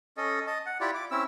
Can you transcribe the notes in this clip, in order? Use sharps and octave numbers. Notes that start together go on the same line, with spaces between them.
C#4 A4 D#5
D#5 A5
F#5
E4 F4 G4 D5
D6
C4 C#4 E4 E6